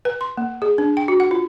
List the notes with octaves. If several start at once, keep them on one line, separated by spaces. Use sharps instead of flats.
B4
C6
A#3
G#4
D4
G5
F#4
F#5
F4